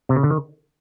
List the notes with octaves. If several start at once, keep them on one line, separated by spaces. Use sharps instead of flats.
C3
C#3
D3
D#3